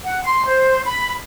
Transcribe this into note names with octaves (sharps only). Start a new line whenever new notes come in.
F#5
C6
C5
B5